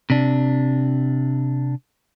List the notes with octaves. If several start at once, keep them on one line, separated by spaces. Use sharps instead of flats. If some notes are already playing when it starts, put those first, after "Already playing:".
C3 D4